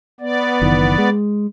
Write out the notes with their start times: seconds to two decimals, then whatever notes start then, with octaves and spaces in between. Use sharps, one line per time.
0.21 B3 D5
0.62 F#1 D#3 E3
0.98 G#3